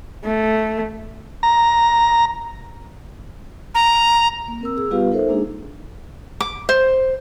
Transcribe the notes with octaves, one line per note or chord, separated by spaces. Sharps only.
A3
A#5
A#5
A#3
C4 A#4 E6
G#4 E6
G3 B3 F4 G4 B4 F5
D#4 A4 A#4 C5 E5
G#3 A#3 D4 D#4 G#4
D6
C5